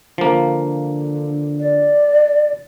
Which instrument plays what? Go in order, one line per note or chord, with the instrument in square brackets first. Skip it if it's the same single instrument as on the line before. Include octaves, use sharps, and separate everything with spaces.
[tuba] D3 [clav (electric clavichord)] F3 A#3
[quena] D5